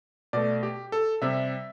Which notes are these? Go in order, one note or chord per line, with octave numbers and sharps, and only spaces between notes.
B2 A3 D5
G4
A4
C3 G3 E5